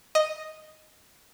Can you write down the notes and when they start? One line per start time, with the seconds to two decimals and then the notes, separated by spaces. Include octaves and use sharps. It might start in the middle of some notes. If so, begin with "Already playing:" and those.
0.15 D#5